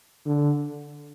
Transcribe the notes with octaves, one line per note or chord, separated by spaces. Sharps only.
D3